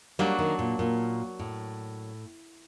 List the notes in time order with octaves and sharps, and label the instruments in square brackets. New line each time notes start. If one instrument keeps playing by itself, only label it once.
[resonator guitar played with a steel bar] F#3 A#3 D4 F#4 [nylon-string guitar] G3
[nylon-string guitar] D#3
A#2
A#2
A2